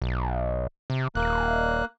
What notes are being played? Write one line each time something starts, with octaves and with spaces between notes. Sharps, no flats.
B1
C3
D#1 A#3 F#6